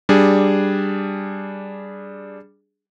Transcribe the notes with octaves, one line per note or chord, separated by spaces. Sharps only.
G3 D4 G#4